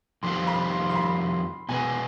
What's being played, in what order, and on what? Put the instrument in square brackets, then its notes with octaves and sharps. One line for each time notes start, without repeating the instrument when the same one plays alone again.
[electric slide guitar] F2 D#3 G3 C4 F4 [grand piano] C6
[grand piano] B5
C6
C6
B5
[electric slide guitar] B2 G#3 B3 [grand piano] G#5